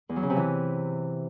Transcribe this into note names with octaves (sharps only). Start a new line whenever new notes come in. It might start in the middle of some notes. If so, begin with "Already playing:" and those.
E2
F#3
C#3
C3
E3